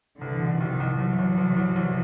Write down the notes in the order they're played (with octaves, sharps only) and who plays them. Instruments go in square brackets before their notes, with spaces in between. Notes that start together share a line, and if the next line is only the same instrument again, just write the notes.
[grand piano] C2 [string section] D3 E3
[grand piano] B2
[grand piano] C2 [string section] D#3 F3
[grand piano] C2
[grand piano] C2 [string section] E3 F#3
[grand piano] C2
C2
C2
C2